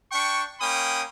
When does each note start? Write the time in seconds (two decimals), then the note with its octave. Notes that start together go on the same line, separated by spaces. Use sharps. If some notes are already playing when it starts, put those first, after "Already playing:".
0.12 D4 G5 C#6
0.60 A#3 C#4 G5 B5 D#6